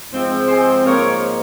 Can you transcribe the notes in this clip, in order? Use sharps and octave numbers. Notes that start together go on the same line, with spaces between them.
G#2 F3 G#3 C4
G#4 C5
G#2 F3 A#3 A#4 C#5